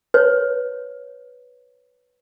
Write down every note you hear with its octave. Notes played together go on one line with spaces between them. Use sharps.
B4 C#5